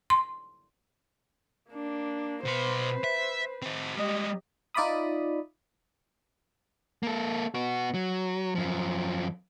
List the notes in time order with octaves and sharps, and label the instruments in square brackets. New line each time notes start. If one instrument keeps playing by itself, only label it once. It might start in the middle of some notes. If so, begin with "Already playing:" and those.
[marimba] C6
[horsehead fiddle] A#3 D4
[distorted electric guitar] B2 C6 [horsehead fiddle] B4 C5
[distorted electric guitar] E5
C4 F#4
[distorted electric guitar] G3 G#3 [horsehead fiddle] G4 D#5
[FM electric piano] D#4 F4 D5 E5 B5 D#6
[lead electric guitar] A#3 A4
B3 F#4
F#3
F#2 F3